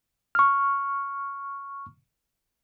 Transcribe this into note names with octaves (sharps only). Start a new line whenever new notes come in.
C#6 F6